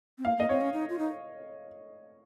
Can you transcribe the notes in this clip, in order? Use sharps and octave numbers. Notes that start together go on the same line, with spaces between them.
C4
A#3 F5
A#3 D#5
C4 C#5
C#4
D#4
F4
D#4